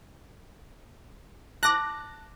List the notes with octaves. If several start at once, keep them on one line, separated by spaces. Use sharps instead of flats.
A5 D6 F#6 A#6